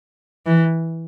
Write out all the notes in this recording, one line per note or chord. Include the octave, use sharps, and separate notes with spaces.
E3